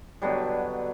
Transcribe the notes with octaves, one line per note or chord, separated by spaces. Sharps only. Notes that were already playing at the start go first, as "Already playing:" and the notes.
B2 D3 F#3 G3